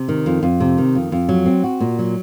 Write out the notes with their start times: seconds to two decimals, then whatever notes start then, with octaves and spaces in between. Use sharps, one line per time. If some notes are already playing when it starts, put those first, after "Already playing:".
Already playing: C3
0.08 D#3
0.26 F2
0.43 F2
0.60 C3
0.78 D#3
0.95 F2
1.12 F2
1.29 F#3
1.46 C4
1.64 F#4
1.80 A#2
1.99 F#3